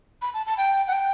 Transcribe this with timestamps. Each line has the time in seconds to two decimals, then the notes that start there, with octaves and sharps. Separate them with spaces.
0.22 B5
0.34 A5
0.46 A5
0.58 G5
0.87 F#5
0.93 G5